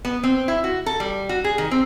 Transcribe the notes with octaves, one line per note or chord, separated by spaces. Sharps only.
B3
C4
E4
F#4
A4
G3
F#4
G#4
D#3
C4